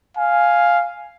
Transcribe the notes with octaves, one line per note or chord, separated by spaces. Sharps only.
F5 G#5